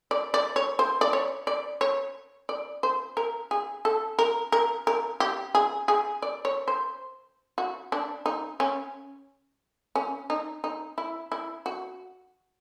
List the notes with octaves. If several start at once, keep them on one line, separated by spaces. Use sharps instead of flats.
D5
D5
C#5
C5
D5
C#5
D5
C#5
D5
C5
A#4
G#4
A4
A#4
A#4
A#4
G4
G#4
G#4
D5
C#5
C5
F#4
D4
D#4
C#4
C#4
D#4
D#4
E4
E4
F#4